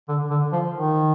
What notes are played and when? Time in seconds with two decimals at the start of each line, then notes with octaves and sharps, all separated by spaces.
0.08 D3
0.31 D3
0.53 F3
0.74 D#3